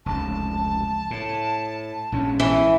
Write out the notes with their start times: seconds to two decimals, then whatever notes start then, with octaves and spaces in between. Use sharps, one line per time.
0.06 F1 C#2 A5
1.11 A2
2.12 A#1 G#2 C#4
2.40 E3